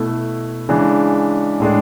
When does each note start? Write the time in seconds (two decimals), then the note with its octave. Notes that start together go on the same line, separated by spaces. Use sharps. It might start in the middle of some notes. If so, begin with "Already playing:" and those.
Already playing: B2 A3 E4
0.69 C#3 E3 G#3 D4
1.60 A2 G#3 D4